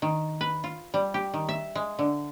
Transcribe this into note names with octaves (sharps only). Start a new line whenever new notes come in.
D#3
B4
F4
G3
G4
D#3
E5
G#3
D3